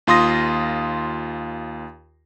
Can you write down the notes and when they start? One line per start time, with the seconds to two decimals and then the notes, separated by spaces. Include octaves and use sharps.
0.07 D#2 F4 C6 D#6 A#6